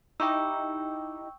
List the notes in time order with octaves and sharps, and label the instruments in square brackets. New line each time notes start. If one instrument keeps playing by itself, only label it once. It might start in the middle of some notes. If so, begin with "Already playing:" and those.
[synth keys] D#4 E4 G4 [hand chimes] G5 C#6 E6